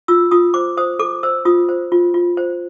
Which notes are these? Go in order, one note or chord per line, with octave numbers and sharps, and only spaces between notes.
F4 E6
F4 D#6
C5 D6
C5 D#6
A4 D6
C5 E6
F4 D#6
C5
F4
F4
C5